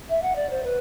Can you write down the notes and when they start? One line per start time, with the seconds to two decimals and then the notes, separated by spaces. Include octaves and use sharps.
0.09 E5
0.22 F#5
0.36 D5
0.50 C5
0.63 B4